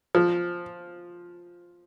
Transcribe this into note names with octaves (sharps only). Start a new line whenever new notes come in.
F3